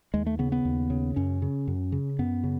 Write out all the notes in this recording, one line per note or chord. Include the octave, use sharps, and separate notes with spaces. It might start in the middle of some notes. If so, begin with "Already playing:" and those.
D#2 G#3
A3
C#3 B3
B3
D#2
C#3
F#2 C#4
C#3
F#2
C#3
F#2 B3
C#3